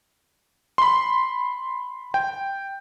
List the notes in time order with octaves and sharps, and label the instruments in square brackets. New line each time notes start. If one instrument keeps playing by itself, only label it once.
[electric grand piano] B5 C6
G5